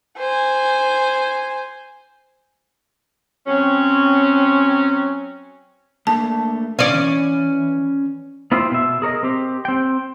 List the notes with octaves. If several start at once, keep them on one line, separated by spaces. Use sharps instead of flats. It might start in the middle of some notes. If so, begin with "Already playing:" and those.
C5 G#5
F#3 C4 C#4
A3 A#3 D4 A5
D3 C#4 C5 D5 F5
E3
B3 E4 F4 G4 B4 C5
B2 E5
G#4 A#4 C#5 D#5
C4 G4
C4 G5